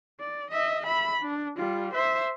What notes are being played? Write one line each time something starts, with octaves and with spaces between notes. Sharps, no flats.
D5
D#5 E5
E5 B5
D4
G3 F4
C5 E5